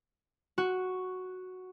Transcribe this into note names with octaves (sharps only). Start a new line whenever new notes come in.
F#4